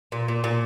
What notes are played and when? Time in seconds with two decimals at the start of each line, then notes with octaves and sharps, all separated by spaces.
0.12 A#2
0.28 A#2
0.44 A#2